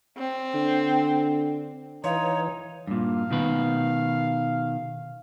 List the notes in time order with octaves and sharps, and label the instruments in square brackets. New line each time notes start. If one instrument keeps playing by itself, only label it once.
[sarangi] C4
[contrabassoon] D3
[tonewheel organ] E3 [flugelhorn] D#4 [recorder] C#5 [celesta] F5 C6
[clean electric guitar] G2 A#2 [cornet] F5
[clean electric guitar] B2 D#3 B4